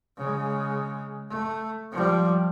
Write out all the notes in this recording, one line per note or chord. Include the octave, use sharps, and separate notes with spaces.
C#3 G#3
A3
F3 G3